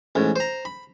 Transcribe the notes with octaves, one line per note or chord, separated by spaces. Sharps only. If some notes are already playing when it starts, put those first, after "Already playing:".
A1 G#2
C5 A#5
B5